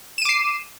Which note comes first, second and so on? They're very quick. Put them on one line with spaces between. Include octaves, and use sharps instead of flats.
E7 D#7 D6 C7